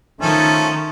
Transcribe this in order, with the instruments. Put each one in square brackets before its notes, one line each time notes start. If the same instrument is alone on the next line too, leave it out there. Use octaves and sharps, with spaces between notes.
[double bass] D#3 [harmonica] F3 A3 C#4